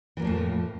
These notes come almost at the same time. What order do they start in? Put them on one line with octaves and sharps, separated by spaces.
E3 A#3 A2 F3 F2